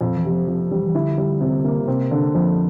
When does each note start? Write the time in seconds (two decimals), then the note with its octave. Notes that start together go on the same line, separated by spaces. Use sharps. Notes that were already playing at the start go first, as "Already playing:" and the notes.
0.01 F2 A#2
0.17 E3
0.25 C3
0.32 F3
0.48 F2 F3
0.71 E3 G3
0.85 E3
0.95 D3 E4
1.18 G3
1.41 C3
1.64 A#3
1.88 C3 C4
2.11 D3
2.35 F2 F3